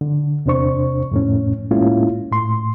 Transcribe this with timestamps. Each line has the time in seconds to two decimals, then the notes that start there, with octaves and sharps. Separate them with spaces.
0.01 D3
0.46 E2 C3 D4 C5 C#6
1.11 F2 A2 C#4
1.71 A2 G#3 A#3 C#4 E4 F4
2.32 A2 C6